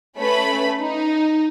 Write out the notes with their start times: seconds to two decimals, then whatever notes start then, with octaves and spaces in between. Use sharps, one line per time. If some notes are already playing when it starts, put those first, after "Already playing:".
0.17 A3 C#4 B4 B5
0.81 D#4